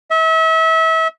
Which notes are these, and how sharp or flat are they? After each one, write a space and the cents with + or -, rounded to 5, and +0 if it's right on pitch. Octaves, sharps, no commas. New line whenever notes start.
E5 -35